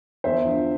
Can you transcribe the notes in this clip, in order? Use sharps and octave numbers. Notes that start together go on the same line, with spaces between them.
E2 C5 E5
D3 F3